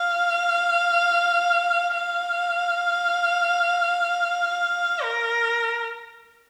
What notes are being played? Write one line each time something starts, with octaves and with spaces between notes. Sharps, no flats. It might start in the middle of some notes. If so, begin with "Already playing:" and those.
Already playing: F5
F5
A#4